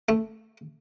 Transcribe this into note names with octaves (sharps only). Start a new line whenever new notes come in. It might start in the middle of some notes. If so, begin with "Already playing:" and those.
A3